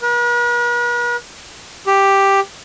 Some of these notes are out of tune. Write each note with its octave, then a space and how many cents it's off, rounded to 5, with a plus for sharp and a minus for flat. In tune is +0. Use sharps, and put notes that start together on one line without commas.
B4 -45
G4 +5